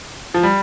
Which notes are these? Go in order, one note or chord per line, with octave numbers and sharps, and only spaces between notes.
F3
G3